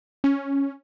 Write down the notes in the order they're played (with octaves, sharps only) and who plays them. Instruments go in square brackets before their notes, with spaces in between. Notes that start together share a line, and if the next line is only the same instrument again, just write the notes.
[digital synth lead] C#4